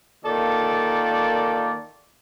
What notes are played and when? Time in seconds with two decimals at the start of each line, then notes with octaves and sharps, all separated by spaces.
0.24 D#3 A#3 F4 A4 D5